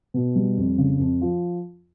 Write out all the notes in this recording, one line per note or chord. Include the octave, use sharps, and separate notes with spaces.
B2
G3
F2
C#3
F2
F3